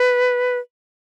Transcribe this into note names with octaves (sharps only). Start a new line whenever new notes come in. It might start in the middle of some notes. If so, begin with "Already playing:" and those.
Already playing: B4